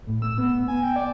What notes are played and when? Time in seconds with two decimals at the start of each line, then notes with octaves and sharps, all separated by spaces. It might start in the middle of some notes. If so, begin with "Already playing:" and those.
0.07 A2
0.22 E6
0.38 B3
0.68 G#5
0.83 G5
0.96 D5